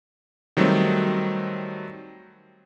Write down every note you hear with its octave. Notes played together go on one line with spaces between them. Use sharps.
D#3 F#3 G3 A3 C4